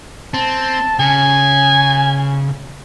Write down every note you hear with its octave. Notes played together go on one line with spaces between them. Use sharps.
C4 A5
C#3 G#5